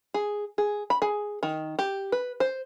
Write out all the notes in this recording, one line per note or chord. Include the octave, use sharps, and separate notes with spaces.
G#4
G#4
B5
G#4
D#3
G4
B4
C5